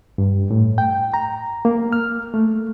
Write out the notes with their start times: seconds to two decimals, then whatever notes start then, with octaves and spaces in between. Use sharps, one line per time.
0.18 G2
0.51 A2
0.78 G5
1.14 A#5
1.65 A#3
1.93 F6
2.34 A3